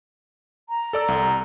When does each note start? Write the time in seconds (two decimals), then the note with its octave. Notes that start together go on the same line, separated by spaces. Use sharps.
0.69 A#5
0.93 A4 D5 E6
1.08 C2